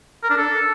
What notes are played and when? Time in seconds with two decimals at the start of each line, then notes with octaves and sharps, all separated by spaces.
0.23 A#4
0.30 D4
0.37 A4